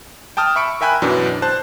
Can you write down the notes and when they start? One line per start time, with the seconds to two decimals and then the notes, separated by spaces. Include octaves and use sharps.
0.37 G5 A5 D#6 F6
0.56 E5 B5 C#6 C#7 D7
0.81 A#4 E5 G5 G#5 B5 F#6
1.02 F#2 B2 E3 D4
1.42 C5 A5 F#6